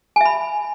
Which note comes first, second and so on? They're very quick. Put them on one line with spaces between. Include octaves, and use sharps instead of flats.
G#5 E5 B5